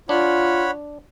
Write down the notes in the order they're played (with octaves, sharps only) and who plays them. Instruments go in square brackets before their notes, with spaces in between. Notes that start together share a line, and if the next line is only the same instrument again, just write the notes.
[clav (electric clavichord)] D4 [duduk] F4 [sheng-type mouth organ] C#5 F#5 B5